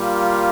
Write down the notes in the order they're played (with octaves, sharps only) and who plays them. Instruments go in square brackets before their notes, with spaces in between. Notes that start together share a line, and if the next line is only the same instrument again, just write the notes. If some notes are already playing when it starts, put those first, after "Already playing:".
Already playing: [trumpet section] G3 A#3 F4